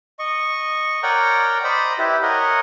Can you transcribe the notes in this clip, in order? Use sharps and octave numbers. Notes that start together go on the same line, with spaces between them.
D#5 C#6
A#4 C#5 D5 F#5 G5 A#5
C5 D5 D#5 A#5 B5
E4 G4 B4
A#4 C#5 D#5 F#5